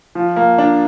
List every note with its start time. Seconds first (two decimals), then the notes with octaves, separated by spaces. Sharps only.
0.15 F3
0.36 A#3
0.58 D4